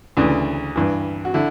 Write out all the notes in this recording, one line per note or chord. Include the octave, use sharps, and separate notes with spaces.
D2 C#3 E3
G2 E3
F#4
D3 E4